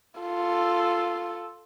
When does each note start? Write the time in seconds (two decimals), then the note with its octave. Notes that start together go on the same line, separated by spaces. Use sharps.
0.20 F4 A4